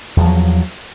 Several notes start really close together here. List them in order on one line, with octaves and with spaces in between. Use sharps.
E2 F3 F#3